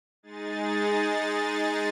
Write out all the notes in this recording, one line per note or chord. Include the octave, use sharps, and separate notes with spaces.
G#3 D#4 G#4 A6